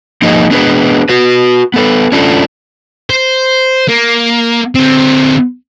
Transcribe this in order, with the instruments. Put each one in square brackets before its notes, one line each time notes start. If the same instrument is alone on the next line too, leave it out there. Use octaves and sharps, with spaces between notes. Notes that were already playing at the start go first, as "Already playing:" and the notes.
[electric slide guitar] F3 A#3 D#4 G#4 D#5
B3 D4 G#4 A#4 B4
F#4 B4
B3 A4 B4
C#4 D4 F4 A4
[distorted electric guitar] C5
A#3
D3 C4